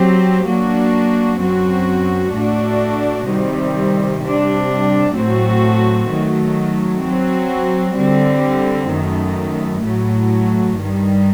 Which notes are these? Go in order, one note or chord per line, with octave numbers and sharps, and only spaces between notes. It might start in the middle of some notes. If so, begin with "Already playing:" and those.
Already playing: F#3 C4 G4
F#3 A#3 D4 F#4
F#2 F#3 C4 F#4
A2 A3 D4 F#4
C3 D#3 G3
C3 G3 D4
A2 F#3 A3 C4 F#4
D#3 F#3 A3
F#3 C4 F#4
D3 G3 C4
F#2 D#3 A3
A2 F#3 A3
G2 D#3 G3